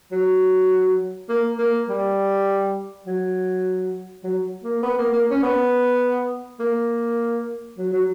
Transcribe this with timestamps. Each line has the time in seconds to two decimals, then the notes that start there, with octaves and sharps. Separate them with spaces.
0.11 F#3
1.29 A#3
1.58 A#3
1.88 G3
3.06 F#3
4.24 F#3
4.64 A#3
4.83 B3
4.98 A#3
5.13 A#3
5.30 C#4
5.42 B3
6.59 A#3
7.78 F#3
7.93 F#3